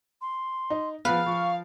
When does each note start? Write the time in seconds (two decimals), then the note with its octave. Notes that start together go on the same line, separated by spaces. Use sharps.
0.22 C6
0.70 D#4
1.05 F3 B3 B4 F5
1.26 F3 C#6